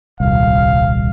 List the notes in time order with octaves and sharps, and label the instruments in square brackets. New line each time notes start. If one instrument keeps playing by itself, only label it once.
[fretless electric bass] D#1 C2 [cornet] F5